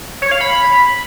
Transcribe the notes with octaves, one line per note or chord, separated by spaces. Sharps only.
C#5
F5
B5